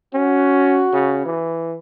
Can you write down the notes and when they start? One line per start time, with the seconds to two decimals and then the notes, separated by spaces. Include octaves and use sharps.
0.14 C#4 F#4
0.93 C#3
1.25 E3